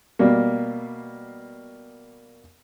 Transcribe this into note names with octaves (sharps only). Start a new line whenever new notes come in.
B2 G3 A#3